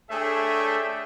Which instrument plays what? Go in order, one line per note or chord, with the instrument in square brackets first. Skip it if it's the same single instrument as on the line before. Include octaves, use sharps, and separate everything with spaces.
[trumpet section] A3 D4 G#4 C#5 E5 G5